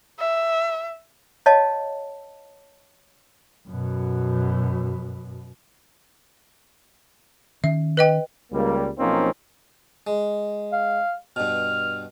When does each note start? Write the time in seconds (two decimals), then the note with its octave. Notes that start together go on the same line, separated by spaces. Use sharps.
0.20 E5
1.46 C#5 D#5 F5 A5
3.69 F#2 B2
7.64 D#3 C#4 E5
7.97 B4 D#5 G5
8.52 C#2 G3 A#3
8.99 B1 F3 A#3 C4 C#4 D#4
10.07 G#3
10.72 F5
11.36 G2 B2 F6